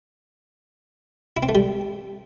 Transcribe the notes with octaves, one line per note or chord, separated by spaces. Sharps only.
E4
C4
A3
G3